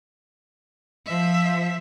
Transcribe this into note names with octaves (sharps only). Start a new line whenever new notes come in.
F3 E5